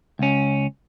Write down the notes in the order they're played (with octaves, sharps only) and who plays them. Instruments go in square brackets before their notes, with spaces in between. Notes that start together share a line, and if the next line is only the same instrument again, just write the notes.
[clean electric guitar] C#2 C#4